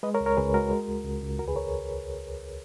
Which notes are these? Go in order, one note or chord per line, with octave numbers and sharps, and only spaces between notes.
G#3 B4 D#5
A#4 C#5
C#2
A#4 C#5
C#2 G#4 B4
G#3 F#4 A#4
G#3
C#2
C#2
C#2
D#2 F#4 A#4
G#4 B4
A#4 C#5